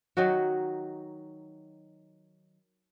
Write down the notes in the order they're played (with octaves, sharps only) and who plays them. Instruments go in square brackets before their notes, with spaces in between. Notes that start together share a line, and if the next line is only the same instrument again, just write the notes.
[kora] D#3 F#3 D#4 F#4